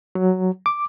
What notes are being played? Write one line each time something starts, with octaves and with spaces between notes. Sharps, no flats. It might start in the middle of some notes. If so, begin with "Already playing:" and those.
F#3
D6